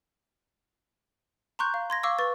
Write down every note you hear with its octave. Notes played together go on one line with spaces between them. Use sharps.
A#5 C6 C#6 F#6 G6
F5
C6 G#6 A#6
F5 C#6 D6 E6
B4 C#6 A6